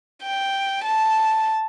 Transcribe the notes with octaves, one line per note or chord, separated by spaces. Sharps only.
G5
A5